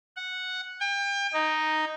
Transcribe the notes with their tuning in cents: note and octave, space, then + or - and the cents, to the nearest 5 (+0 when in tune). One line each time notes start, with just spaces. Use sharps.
F#5 -5
G5 +35
D#4 +0